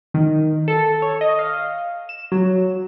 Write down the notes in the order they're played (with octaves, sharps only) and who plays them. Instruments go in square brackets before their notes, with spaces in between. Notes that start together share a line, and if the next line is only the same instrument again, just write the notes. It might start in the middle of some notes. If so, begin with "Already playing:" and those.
[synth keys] D#3
A4
C#5
D#5
F5
E7
F#3